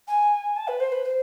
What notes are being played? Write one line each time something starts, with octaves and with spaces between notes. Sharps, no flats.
G#5
A5
B4
C5
B4
C5